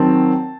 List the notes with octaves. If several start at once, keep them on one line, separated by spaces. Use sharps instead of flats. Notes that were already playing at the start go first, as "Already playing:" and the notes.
Already playing: D#3 F#3 C4 A5